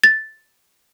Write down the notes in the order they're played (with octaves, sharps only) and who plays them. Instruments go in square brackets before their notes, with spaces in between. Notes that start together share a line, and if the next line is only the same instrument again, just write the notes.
[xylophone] A6